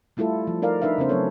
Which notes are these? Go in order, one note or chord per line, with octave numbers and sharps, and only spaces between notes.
G3 A3 E4 F4 A4
F3
D#4 A#4 D5 F5
D4 D#4 B4 E5 F5
C#3 B3 C#4 C5
F#3 A3 C4 A4 C#5